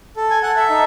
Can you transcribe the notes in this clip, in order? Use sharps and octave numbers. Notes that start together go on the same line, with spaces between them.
A4
G#5
A4 F#5
E5
D#4